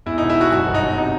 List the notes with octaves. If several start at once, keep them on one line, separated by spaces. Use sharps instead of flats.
E2 E4
E1 D#4
E4
E1 F#4
F#2 F#4
G1
D#4
F#3
C3 D#4